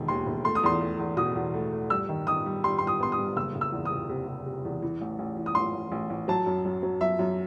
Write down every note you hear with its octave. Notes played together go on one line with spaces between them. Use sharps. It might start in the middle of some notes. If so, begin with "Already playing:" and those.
Already playing: E1 D#3 G3
D#2 C6
E1
A3 C6
D#6
E2 C6
A3
E2
B2 D#6
E2
A3
A3
G2 E6
D#3
D#3 D#6
G3
G3 C6
G3 C6
D#6
B3 C6
D#6
G2
F#1 E6
F#1
E6
E2
D#6
C3
C3
C3
C3
E2
E3
A1
A1
E3
D#6
A1 C6
A1
A1
A1
F#3 A5
F#2
F#2
F#3
F#2 E5
F#2